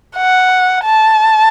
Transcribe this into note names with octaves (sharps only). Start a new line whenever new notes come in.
F#5
A5